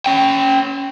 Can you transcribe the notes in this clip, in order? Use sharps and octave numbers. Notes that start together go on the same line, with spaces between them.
C#4 G5